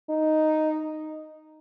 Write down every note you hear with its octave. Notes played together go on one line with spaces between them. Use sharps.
D#4